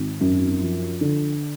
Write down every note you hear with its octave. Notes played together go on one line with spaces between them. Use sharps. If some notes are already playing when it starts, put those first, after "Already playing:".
Already playing: G#1
F#2
F3
D3